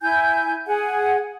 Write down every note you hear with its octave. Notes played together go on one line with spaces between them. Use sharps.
E4 G#5 G6
G#4 F#5 G#5